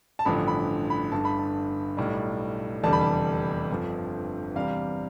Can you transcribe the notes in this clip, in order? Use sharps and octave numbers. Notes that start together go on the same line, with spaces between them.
A5
A1 G2 D3 F3 B5
B5
B5
G1 G2 D3 A5
B5
A5
B1 A2 G3
F1 E2 D3 G3 A5
B5
A5
G1 F2 D3 F3
E2 C3 G3 F5